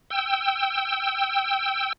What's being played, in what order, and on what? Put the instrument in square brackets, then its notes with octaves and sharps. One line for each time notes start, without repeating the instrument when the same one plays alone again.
[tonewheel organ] G5 E6